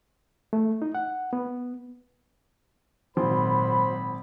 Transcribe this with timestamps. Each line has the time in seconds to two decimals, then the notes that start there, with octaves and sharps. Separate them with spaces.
0.53 A3
0.82 D#4
0.95 F#5
1.33 B3
3.17 G#1 A#2 F#3 C5 B5